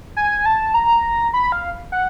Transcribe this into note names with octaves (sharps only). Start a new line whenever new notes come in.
G#5
A5
A#5
B5
F5
F#5